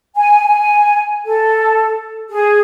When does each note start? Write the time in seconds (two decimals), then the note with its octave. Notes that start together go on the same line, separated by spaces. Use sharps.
0.15 G#5
0.47 G#5
1.25 A4
2.30 G#4